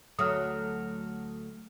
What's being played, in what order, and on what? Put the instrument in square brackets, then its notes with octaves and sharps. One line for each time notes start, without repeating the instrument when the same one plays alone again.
[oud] D2 F#3 A3 [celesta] D#6 F6